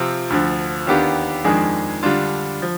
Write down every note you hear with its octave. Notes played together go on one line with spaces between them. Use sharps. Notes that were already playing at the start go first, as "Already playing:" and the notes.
Already playing: C3 F3 C4 F4
D2 D3 F3
D#2 D#3 B3 D4 G4
F2 D#3 G#3 D4 G#4
D3 G3 D4 F4
F3